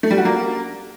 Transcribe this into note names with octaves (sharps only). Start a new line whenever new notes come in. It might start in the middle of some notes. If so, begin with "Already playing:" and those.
A3
G3
F#4
A#3